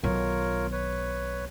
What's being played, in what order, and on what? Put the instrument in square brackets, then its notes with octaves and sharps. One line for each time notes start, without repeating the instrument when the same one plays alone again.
[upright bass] B1 D#3 [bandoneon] F4 A#4 C#5
[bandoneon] B4 C#5